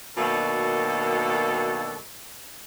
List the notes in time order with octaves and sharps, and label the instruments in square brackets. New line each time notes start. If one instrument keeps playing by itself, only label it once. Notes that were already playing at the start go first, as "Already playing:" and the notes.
[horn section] B2 D#3 F#3 A#3 D4 A4